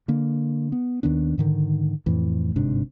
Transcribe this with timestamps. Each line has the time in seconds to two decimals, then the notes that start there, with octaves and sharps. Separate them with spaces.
0.08 D3 A#3
0.72 B3
1.03 D#2 D#3 B3 D4
1.38 G#2 D3 D#3
2.06 F2 A2 E3
2.56 G1 G#2 C3 D4